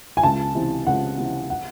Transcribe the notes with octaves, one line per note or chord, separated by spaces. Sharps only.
G#5
C#2 A5
C3 E3
C#2 F#5
C3 E3
F#5